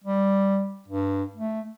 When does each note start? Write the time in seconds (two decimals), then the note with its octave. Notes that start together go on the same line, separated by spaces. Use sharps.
0.04 G3
0.88 G2
1.36 A3